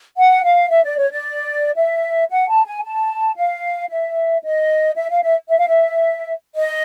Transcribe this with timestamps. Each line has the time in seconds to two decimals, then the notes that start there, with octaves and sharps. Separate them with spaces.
0.17 F#5
0.44 F5
0.71 E5
0.84 D5
0.98 C#5
1.10 D5
1.76 E5
2.31 F#5
2.48 A5
2.66 G#5
2.84 A5
3.37 F5
3.89 E5
4.43 D#5
4.97 E5
5.10 F5
5.23 E5
5.49 E5
5.59 F5
5.67 E5
6.55 D#5